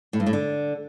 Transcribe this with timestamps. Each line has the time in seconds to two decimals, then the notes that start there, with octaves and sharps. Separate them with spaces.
0.13 A2
0.20 G2
0.26 A2
0.33 D3